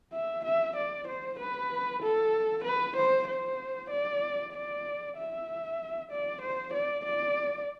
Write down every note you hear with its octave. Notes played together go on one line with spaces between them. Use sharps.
E5
E5
D5
C5
B4
A4
B4
C5
C5
D5
D5
E5
D5
C5
D5
D5